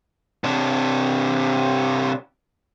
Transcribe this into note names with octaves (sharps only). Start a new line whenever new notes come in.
C3 D4